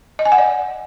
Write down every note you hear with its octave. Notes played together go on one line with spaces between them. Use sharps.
D#5
G#5
F#5
D5